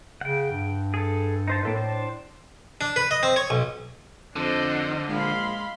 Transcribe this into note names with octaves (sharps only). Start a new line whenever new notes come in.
C#3 F#5 G5
G2
G#4 A4
D#4 C5 A5
A2 A#3 A4 B4
D4 C5 A5
D4
B4
D#5
C4
C#5
B1
F2 D3 D4 C5 D#5
A#1 G#3 F5 B5 C6